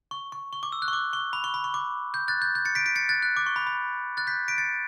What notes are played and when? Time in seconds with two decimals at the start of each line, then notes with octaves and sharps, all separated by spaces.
0.11 C#6
0.32 C#6
0.53 C#6
0.63 D6
0.72 E6
0.82 F#6
0.88 C#6
0.93 D6
1.13 C#6
1.33 B5
1.44 C#6
1.54 B5
1.64 C#6
1.74 D6
2.14 G6
2.28 F#6 A6
2.42 G6
2.55 G6
2.65 A6 C#7
2.75 B6 D7
2.86 B6 D7
2.96 A6 C#7
3.09 F#6 A6
3.23 F#6
3.37 D6
3.46 C#6
3.56 B5
3.67 B5
4.17 F#6 A6
4.27 G6 B6
4.48 B6 D7
4.58 A6 C#7